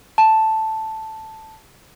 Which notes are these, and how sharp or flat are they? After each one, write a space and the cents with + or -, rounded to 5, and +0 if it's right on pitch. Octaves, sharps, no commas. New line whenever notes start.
A5 +0